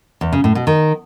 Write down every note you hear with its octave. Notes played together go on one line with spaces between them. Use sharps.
E2
C#3
A2
B2
D#3